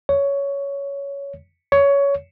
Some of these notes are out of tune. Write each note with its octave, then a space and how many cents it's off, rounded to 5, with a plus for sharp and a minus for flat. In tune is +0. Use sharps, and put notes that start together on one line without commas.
C#5 +15
C#5 +20